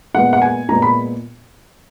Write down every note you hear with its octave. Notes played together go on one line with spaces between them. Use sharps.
A#2 G#3 B3 F#5
F#5
G#5
A#2 G#3 B3 A#5
B5